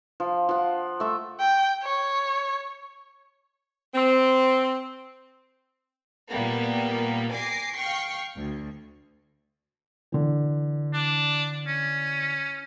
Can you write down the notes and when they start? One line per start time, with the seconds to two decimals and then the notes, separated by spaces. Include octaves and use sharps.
0.20 F3
0.49 F3 F#5
1.00 A3 E5
1.40 G5
1.83 C#5
3.94 C4
6.32 A#2 G3 A#3 B3
7.32 G#5 D6 A#6 C7
7.75 F5 G5 C#6 C7
8.37 D2
10.12 D3 E3
10.93 D4
11.67 C#4